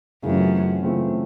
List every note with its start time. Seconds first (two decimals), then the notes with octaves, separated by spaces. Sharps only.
0.23 F#2 C#3 E3 A3 C4 F4
0.83 C#3 E3 A3 C4 F4